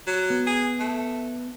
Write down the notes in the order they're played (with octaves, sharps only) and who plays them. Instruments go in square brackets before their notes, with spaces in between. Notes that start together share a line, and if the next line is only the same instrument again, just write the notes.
[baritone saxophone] F#3
[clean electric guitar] B3
[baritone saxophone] G#4
A3